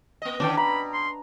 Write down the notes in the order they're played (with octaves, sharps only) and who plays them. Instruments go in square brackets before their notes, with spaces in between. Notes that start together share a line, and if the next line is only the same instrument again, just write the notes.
[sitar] A#3 D#5
[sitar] D3 D#3 C#4 [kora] D4 D5 G5
[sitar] B2 [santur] A#5 [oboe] B5
[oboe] C6